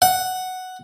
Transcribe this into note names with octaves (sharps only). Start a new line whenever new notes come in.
F#5